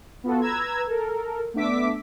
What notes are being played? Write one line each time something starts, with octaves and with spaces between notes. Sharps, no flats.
B3 F4 F#4 A4
B4 A#5 E6 G#6
A4 A#4
A3 B3 D4 E5 D6 B6